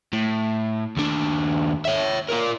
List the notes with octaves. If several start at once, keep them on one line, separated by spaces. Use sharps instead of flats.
A2
D#2 D4
C#5 E5
F4 A#4